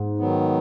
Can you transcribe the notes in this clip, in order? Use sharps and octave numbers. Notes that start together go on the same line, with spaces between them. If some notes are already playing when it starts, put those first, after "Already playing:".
Already playing: G#2
D#3 F#3 B3